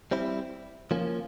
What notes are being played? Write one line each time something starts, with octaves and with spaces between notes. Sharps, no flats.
G3 C4 E4
F3 A#3 C#4